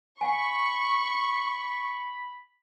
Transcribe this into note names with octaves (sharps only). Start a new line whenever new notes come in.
F5 F#5 G#5 B5 C#6